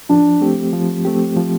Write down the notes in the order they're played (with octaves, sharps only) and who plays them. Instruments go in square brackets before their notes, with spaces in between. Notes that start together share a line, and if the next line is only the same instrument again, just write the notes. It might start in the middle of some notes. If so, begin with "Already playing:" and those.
[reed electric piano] F3 [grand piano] D4
[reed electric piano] A3 C4 G4
F3
A3 C4 G4
F3